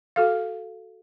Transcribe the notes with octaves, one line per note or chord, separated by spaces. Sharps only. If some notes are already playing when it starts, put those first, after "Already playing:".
F#4 A4 F5